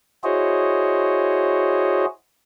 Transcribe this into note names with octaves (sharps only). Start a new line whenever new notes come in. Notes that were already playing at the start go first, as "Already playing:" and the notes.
E4 F#4 G#4 C5 C#5 D#5